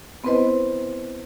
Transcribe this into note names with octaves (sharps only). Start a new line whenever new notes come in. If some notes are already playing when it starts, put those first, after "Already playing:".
B3 C4 E4 B4 C5 D#5